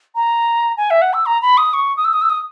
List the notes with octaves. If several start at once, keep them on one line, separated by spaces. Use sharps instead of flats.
A#5
G#5
E5
F#5
E6
A#5
B5
D#6
C#6
D#6
E6
D#6
E6
D#6